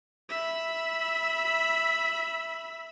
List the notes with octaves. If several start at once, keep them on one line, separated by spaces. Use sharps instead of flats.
E5 B5